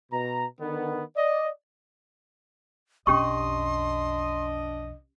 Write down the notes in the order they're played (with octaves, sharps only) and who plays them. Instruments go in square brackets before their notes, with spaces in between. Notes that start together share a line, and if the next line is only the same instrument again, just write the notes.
[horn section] B2 A#5
D3 D#3 B3
D5 D#5
[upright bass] B1 F2 [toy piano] C#4 G4 C#6 [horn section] D4 D#5 [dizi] C6